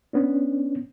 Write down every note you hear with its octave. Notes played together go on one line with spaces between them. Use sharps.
B3 C#4 D4